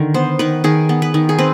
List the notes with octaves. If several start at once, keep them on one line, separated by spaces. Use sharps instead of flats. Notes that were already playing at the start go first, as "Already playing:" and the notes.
Already playing: D3 D#3
B3 C5
D#3 B4
D#3 G#4
B3
B4
D#3
G#4
C4 B4